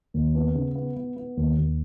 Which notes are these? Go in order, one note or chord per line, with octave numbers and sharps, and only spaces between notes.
D#2
B3
C#3
B3
B3
B3
D#2
D#2